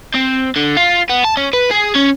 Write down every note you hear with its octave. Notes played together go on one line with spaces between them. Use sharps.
C4
D3
F4
B3
A5
C#4
B4
G#4
C#4